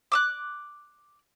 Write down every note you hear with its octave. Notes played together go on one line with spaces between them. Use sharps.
D6 E6 F#6